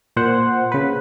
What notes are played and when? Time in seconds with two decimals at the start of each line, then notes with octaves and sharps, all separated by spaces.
0.16 A#2 C5 F#5
0.72 C#3 B4